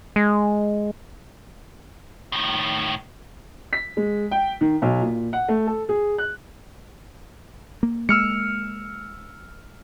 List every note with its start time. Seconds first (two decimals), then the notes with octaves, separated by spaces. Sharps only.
0.16 G#3
2.32 A2 D#3
3.73 B6
3.97 G#3
4.31 G5
4.61 D#3
4.82 B1
5.01 A#2
5.33 F#5
5.48 A3
5.67 A4
5.89 G#4
6.18 F#6
7.83 A#3
8.09 G#3 A#3 E6 F6 C#7